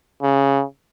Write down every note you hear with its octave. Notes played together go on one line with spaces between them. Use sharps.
C#3